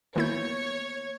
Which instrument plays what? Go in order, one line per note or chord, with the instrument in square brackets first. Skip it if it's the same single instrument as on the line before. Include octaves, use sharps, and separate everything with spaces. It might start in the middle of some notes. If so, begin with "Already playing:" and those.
[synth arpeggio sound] D#3 E4 G6 [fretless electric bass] A#3 B3 [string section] C#5